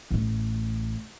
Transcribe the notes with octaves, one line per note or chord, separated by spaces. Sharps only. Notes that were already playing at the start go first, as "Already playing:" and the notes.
A1 A3